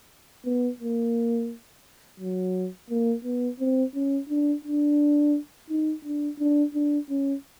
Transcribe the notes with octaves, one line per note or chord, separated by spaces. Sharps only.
B3
A#3
F#3
A#3
B3
C4
C#4
D4
D4
D#4
D4
D4
D4
C#4